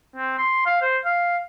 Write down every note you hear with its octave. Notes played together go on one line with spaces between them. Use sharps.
C4
C6
F5
C5
F5